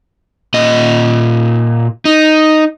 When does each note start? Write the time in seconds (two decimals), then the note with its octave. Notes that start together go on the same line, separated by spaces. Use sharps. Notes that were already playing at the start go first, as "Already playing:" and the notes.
0.54 A#2 D#5
2.05 D#4